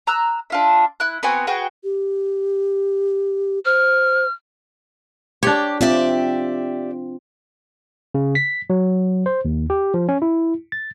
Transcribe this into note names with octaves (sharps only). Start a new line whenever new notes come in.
A#5 E6 F#6
D4 F4 E5
E4 F#6
B3 C4 F#4 G#5
F#4 G#4 B4 G5
G4
C5 F6
D4 G4 C#5
C4 F4 G4 D5 E5
C#3
B6
F#3
C5
D#2
G4
F3
C#4
E4
A6